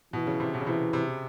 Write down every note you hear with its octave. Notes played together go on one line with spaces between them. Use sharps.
B2 E3
C#3
C3
B2
C#3
C3 E3
C3